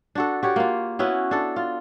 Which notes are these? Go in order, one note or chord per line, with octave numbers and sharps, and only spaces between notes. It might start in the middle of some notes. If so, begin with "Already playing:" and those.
D4 F#4 A4
F#4 G4 C#5
A#3 F4
B3 C#4 E4 F#4
D4 A4
F4